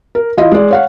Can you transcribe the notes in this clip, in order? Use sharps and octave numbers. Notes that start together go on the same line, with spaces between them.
A#4
E3 F4 D#5
G#3 D5
C#5 F5 F#5